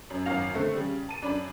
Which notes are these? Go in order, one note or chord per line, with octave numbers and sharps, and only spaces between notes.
F#2
G#1 F#2 F5 A#6 F7
D3 A3 C4
C#3 G3
A5 D#7
F#2 D4 D5 B5